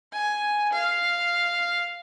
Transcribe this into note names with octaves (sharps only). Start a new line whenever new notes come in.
G#5
F5